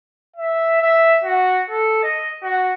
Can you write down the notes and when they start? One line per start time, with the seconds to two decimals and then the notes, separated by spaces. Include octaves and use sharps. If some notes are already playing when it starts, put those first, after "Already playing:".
0.36 E5
0.82 E5
1.24 F#4
1.70 A4
2.04 D#5
2.43 F#4